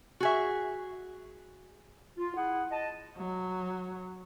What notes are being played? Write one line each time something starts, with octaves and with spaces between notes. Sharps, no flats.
F#4 G#4 E5
F4
E4 G#4 F#5
D#5 A5
F#3